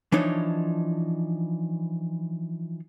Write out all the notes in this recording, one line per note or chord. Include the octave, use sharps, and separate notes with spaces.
E3 F3 D4 D#4 C#5